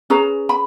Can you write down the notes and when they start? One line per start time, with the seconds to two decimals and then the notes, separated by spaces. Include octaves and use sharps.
0.10 C#4 G#4 B4 A#5
0.49 B5